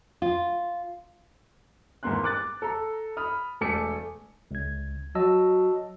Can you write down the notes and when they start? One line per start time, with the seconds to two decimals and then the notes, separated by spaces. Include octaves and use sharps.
0.22 F4
2.03 G#1 E2 A#3 B3 C6 F#6
2.24 D6 F#6 A6
2.62 A4 A#5
3.17 B5 D#6 F6
3.61 E1 A3 A4 G#5 D6 C#7
4.51 C#2 G#6
5.15 F#3 D#5 A5 E6